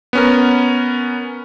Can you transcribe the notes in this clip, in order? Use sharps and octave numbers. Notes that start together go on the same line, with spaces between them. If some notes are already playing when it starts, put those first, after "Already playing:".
B3 C#4 A#4